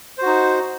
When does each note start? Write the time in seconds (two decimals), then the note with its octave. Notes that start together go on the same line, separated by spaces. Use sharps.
0.18 C5
0.22 F#4
0.26 D#4